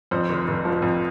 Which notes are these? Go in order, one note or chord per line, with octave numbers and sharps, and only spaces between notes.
F2 C5
F1
F1
F3
F2